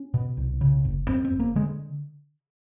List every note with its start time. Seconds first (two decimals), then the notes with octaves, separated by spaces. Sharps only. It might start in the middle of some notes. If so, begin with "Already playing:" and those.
Already playing: C#4
0.14 B2
0.37 C2
0.61 C#3
0.85 F#1
1.08 F#2 C4
1.25 C4
1.32 F#1
1.40 A#3
1.55 D3 G#3